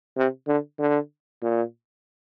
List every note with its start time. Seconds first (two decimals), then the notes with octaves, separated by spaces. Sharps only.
0.17 C3
0.47 D3
0.79 D3
1.43 A#2